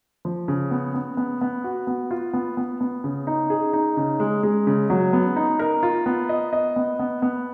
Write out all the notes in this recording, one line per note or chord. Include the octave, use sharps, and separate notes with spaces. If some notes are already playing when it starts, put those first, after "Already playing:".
F3
C#3
B3
B3
B3
B3
F#4
B3
F4
B3
B3
B3
C#3
D#4
G#4
D#4
C#3
G#3
G#3
C#3
F#3
B3
D#4
A#4
F4
B3
D#5
D#5
B3
B3
B3